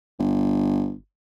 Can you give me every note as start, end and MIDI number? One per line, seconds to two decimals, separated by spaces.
0.19 0.93 31